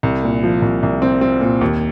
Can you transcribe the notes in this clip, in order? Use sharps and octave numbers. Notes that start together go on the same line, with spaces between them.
C2
A#2
F3
C2
C2
C4
C4
A#2
D#2